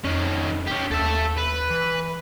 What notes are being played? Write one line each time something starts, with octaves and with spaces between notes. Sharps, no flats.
F2 D#3 C#4
C#4 G4
D#2 A4 E5
B4
E3